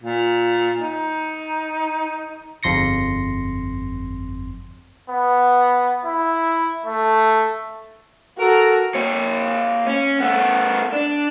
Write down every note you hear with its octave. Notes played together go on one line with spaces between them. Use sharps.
A#2
D#4
G1 F2 C6 A#6 C#7
B3
E4
A3
F#4 A4 A#4
A#3 C#5
C#4
A3 B3
D4